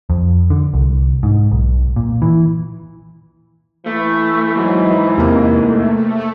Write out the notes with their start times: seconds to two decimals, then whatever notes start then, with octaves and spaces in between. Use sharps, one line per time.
0.10 F2
0.50 D3
0.74 C2
1.23 G#2
1.51 B1
1.96 A#2
2.22 E3
3.86 E3 A3
4.56 G#2 F#3
5.18 E2 C3 A#3
5.66 A3